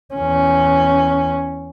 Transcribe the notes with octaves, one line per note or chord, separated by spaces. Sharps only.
E2 C#4